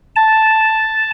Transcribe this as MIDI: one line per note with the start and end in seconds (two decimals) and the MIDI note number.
0.16 1.11 81